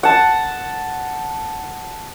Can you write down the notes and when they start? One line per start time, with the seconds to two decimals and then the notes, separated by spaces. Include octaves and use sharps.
0.03 F#5 A5